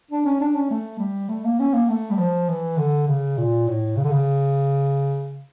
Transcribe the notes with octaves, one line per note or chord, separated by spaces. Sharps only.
D4
C#4
D4
C#4
A3
G3
A3
A#3
C#4
A#3
A3
G3
F3
E3
D3
C#3
A#2
A2
C#3
D3
C#3